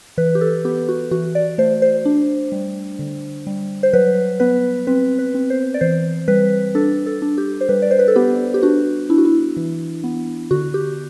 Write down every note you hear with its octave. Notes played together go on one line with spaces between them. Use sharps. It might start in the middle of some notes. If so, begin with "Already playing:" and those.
E3 B4
G4
A4
B3 G4
F#4
E3 F#4
D5
A3 C5
C5
D4
G3
D3
G3
C5
F#3 B4
B3 B4
C4 B4
B4
C4
C5
D5
E3 C5
G3 B4
D4 A4
A4
D4
G4
C5
G3 B4
D5
C5
B4
A4
B3 G4
G4
D4 F#4
D4 E4
F#4
E4
E3
B3
D3 F#4
G4